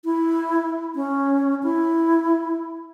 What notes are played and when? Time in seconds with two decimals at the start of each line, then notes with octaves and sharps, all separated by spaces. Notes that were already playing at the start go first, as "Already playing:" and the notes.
0.05 E4
0.95 C#4
1.63 E4